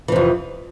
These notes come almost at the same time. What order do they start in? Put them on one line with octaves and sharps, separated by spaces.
E3 C3 F2